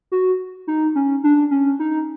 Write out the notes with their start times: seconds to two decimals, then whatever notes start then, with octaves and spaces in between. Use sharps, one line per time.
0.12 F#4
0.67 D#4
0.95 C#4
1.24 D4
1.51 C#4
1.79 D#4